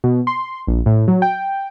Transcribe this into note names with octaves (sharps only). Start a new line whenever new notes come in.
B2
C6
A#1
A2
F#3
G5